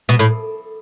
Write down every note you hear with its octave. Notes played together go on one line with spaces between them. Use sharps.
B2
A2